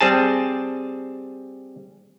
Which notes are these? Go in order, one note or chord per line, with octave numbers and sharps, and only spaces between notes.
G3 C4 G#4 A5